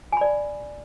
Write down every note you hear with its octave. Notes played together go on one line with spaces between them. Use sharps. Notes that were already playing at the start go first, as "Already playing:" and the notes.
D5 G#5 B5